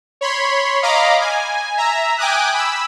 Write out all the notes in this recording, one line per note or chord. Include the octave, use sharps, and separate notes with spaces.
C#5 B5 C6
D#5 F5 A#5 B5 D6
G#5
E5 A#5
G5 G#5 D6 D#6 F#6
B5 E6